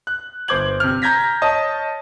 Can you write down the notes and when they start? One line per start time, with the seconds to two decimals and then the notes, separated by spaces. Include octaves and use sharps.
0.07 F#6
0.48 G1 C5 D6 G6 G#6 F#7
0.80 C3 F6
1.02 A#5 G6 G#6 A#6 B6
1.42 C#5 D#5 A5 D#6